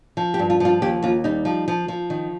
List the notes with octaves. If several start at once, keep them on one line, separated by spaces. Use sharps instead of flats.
F3
G4
G2
F4
F3 F4
D#2 G4
D#2 F4
G3 D#4
F3
F3
F3
D#3